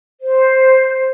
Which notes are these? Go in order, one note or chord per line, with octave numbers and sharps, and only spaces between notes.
C5